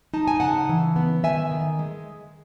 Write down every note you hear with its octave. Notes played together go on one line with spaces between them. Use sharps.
D#4 A5
G#5
C#3 F#5 A5
E3
B3
D#3 E5 G#5
D#3
G#3